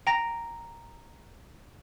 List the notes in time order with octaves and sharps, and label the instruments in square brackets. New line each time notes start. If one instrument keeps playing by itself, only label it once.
[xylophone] G5 A#5 A#6